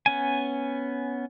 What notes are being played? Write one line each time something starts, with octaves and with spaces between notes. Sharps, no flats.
B3 C#4 G#5